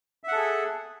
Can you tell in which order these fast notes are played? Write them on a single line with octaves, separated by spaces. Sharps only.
E5 F#5 A4 G#4